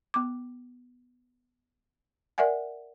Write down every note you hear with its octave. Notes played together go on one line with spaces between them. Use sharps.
B3 D6
A#4 D5 E5 F#5 G#5